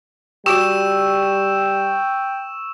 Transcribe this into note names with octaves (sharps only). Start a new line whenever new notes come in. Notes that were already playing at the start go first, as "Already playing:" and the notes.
G3 F#4 G4 G5 C#6 E6 E7